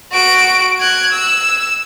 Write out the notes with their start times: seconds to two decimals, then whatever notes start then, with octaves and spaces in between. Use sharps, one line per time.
0.12 F#4 D7
0.81 F#6 G#6
1.12 E6